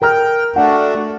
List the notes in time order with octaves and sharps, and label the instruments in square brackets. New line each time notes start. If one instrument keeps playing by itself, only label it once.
[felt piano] A#4 A#5 F6 [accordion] G5
[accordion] A3 D4 F#4 [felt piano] F#5